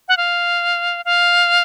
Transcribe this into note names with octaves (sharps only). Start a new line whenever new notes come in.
F#5
F5
F5